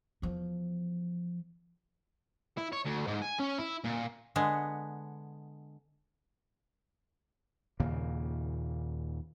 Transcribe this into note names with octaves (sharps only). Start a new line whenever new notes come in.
E2 F3
E4
C#5
D2
G#2
G#5
C#4
E4
A#2
D3 G#3 B3
D#2 A#2 C#3 A#3